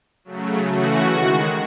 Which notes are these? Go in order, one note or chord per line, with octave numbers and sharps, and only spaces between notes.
C#3 F#3 A3
C#3 E3 A3 F#4
D#3
G#3